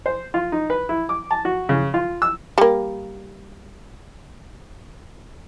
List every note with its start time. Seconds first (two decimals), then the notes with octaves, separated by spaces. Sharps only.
0.06 C5
0.34 F4
0.52 D#4
0.70 B4
0.89 E4
1.09 D6
1.31 A5
1.45 F#4
1.69 C#3
1.94 F4
2.22 E6
2.58 G3 A#3